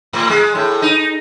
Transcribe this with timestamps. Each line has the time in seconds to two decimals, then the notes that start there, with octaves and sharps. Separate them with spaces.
0.13 A2
0.30 G#3
0.55 A2
0.82 D#4